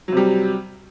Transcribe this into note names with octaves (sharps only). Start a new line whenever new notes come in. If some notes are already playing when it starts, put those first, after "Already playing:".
C3 F#3 G3